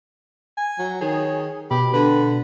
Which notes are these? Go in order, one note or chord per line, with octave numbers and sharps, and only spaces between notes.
G#5
F#3
D#3 G#4 C#5
B2 G4 B5
D3 B4